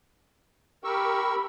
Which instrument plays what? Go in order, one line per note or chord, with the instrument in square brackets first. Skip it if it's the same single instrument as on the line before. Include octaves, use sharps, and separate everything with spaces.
[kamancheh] G4 B5 [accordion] A#4 C#6 E6